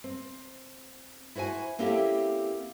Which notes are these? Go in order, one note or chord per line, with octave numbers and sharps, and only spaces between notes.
C4
E4 F#4 C5 F#5 G#5
A#3 C4 C#4 E4 G4 A4